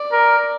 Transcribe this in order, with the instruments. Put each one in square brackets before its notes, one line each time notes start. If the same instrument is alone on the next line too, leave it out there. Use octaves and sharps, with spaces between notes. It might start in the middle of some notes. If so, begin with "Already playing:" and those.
Already playing: [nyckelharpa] D5
[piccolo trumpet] A#4